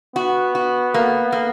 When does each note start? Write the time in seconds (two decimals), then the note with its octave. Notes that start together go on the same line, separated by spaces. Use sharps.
0.16 B3 F#4
0.55 F#4
0.94 A#3
1.32 A#3